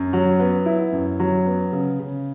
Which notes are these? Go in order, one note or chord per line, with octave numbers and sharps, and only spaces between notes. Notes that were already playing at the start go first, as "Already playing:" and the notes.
Already playing: F#2
F#3
B3
E4
F#2
F#3
B3
C#3
C#3